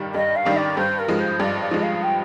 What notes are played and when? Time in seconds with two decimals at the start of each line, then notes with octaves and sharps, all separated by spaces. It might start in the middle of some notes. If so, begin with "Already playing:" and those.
Already playing: G2 D#3 G3 D4
0.14 G2 D#5
0.36 F5
0.45 D#3 G3 D4
0.56 D5
0.77 G2 C5
0.99 A#4
1.08 F3 G#3
1.19 C5
1.40 G2 D5
1.61 D5
1.71 F3 G#3
1.82 F5
2.03 G5